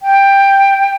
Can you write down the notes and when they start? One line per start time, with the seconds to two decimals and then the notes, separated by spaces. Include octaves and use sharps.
0.01 G5